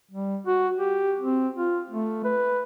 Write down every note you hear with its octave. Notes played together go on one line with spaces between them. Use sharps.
G3
F#4
G4
C4
F4
A3
B4